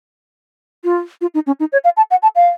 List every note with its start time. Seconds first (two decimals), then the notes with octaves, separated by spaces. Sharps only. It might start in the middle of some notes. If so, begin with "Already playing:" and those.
0.84 F4
1.21 F4
1.34 D#4
1.47 C#4
1.60 D#4
1.72 C#5
1.84 F5
1.97 A5
2.11 F#5
2.22 A5
2.36 F5